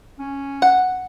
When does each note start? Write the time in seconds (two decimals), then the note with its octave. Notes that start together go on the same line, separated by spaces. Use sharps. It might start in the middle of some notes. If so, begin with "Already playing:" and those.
0.19 C#4
0.62 F#5